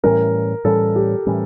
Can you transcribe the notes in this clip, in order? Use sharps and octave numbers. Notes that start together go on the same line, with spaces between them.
A2 E3 G3 C#4 A#4
A2 E3 G3 C#4 A4
G4
A2 E3 G3 C#4